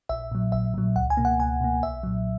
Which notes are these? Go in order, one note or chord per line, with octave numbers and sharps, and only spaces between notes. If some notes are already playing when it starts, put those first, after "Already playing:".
A#1 E5
A#2 F#3
A#1 E5
A#2 F#3
C#2 F#5
G#5
B2 A#3
F#5
C#2 G#5
B2 A#3
B1 E5
A#2 F#3